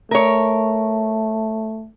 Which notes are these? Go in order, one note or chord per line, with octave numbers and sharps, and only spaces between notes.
A3 A#4 C#5